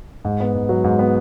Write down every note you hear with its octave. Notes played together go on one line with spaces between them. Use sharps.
G#2
B3
G#2
F#3
G#2
B3